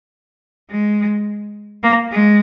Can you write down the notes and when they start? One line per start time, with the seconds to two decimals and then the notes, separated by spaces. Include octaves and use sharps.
0.70 G#3
1.83 A#3
2.12 G#3